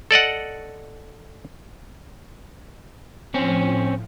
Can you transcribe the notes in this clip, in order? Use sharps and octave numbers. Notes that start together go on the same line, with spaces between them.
A4 D5 D#5 F#5
A2 F3 C4 C#4